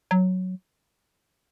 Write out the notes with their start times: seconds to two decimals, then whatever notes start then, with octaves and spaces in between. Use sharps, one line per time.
0.11 F#3